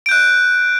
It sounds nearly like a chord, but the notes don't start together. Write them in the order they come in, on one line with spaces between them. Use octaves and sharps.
D7 G6 F#6